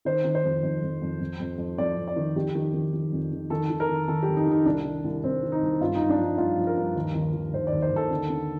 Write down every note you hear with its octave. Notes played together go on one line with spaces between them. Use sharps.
D#3 C5
D#3
C5
F2
F2
F2
F2
F2
F2
F2
F2 D5
F2
D5
D#3
F2 G4
D#3
D#3
D#3
F2
D#3
D#3 A4
D#3
A#4
D#3
D#3 A4
F2 G4
D#4
D#3
D#4
C2 D4
D#3
C2
C2 C4
D#3
D#4
C2
G2 F4
G2 D#4
D4
F3 D#4
G2 F4
F3
A#4
G2
D#2
D#3
D#3
D#2 C5
D5
D#2
C5
D#2
A4
D3
D3